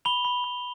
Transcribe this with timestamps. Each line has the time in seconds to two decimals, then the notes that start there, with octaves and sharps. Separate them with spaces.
0.05 B5 F7 G7
0.25 B5
0.44 B5